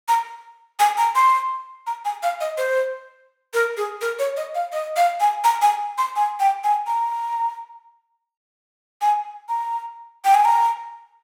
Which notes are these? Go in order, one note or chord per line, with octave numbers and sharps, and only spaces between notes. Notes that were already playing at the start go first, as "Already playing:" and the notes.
A#5
G#5
A#5
C6
A#5
G#5
F5
D#5
C5
A#4
G#4
A#4
C#5
D#5
F5
D#5
F5
G#5
A#5
G#5
C6
G#5
G5
G#5
A#5
G#5
A#5
G5
G#5
A#5